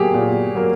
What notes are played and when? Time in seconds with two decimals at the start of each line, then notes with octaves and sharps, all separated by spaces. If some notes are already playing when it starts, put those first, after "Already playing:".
Already playing: F#3 A#3 G4 G#4
0.14 A#2
0.55 F#3 A#3